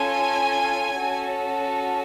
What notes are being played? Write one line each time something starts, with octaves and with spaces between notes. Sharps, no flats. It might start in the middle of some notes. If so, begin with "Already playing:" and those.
Already playing: C#4 F4 A4 G#5
C#4 F#4 A4